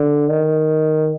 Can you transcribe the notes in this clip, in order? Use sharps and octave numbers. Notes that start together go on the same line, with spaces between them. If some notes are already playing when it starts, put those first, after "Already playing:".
Already playing: D3
D#3